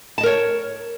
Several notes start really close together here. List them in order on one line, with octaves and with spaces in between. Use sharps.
A5 D#5 A#4 C#5